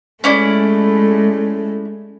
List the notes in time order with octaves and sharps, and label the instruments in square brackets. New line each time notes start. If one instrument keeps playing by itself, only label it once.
[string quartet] G#3 A3 [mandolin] C#4 E4 D5